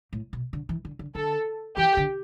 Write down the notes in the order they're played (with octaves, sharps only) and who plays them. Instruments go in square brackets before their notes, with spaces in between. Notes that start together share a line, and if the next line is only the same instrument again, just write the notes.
[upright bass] A2
B2
D3
E3
D3
D3
[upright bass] D3 [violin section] A4
[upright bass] E3 [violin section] G4
[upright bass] D3